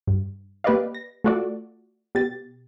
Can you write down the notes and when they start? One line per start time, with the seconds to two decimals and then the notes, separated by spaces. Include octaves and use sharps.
0.07 G2
0.64 A#3 G4 B4 D5 D#5 F5
0.95 A#6
1.24 A3 F4 F#4 A4 D5
2.15 B2 G4 A6